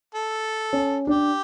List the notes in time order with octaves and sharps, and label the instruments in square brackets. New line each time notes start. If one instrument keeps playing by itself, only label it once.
[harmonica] A4
[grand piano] C#4
[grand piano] D4 [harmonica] G4